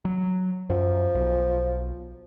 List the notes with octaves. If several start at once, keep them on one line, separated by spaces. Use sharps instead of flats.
F#3
F#2 F3
B1